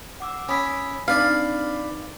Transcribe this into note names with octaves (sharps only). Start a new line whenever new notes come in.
F#5 D6 E6
C#4 G#5 B5 D#6 E6 B6
C4 D4 D#4 B4 D5 F5